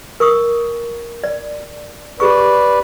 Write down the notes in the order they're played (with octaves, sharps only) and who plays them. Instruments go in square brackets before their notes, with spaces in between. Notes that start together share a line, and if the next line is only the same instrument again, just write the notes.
[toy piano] A#4 C#6 D#6
D5
[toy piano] G4 G#4 C#6 [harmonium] B4 D5